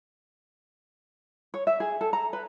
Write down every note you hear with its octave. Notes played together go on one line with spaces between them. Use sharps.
C#5
E5
G#4
A4
A#5
B4